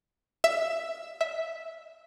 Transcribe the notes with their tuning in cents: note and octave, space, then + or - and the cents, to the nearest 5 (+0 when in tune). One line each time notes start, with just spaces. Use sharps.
E5 +5
E5 -5